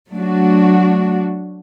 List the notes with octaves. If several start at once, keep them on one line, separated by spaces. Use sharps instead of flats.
F#3 A3 D4 F#4